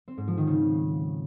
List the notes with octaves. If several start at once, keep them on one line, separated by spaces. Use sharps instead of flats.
C4
G#2
F3
D#3
C#3